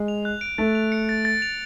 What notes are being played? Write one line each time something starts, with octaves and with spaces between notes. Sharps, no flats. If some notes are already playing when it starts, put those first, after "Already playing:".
Already playing: G#3
F7
F#6
D7
A3 A6
F7
C#7
A6
A6
F7